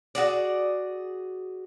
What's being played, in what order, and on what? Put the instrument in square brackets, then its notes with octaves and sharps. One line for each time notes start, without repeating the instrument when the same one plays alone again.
[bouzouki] F#4 G#4 D5